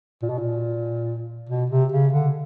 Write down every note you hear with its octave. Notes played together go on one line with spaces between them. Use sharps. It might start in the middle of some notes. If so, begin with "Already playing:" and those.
A#2
B2
A#2
B2
C3
C#3
D3